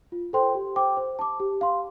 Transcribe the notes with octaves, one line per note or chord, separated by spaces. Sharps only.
F4
A4 C5 G5 C6
G4
C5 G5 D6
C5
A5 D6
G4
F5 C6